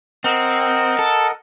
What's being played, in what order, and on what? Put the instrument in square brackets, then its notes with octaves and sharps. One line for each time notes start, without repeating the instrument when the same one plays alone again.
[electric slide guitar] C4 [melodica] A#4 D#5 F#5
[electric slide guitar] A4